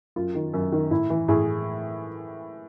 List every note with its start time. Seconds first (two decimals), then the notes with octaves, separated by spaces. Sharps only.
0.16 F#2 F4
0.35 D#3
0.54 F#2
0.72 D#3
0.91 A2 E4
1.10 E3
1.28 A2 G#4